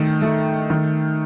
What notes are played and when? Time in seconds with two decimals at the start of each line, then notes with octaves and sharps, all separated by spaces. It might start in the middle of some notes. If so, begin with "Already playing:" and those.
Already playing: D#3 A3
0.22 A3
0.70 D#3